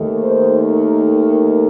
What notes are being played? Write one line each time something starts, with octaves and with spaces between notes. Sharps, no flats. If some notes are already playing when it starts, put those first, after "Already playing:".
Already playing: D#2 D#3 A3
C5
A#4
A#4